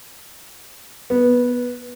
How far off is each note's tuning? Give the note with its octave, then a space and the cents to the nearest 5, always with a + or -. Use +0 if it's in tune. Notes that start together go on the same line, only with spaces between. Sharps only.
B3 -10